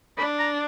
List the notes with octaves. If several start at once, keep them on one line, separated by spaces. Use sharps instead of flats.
D4 B5
A#5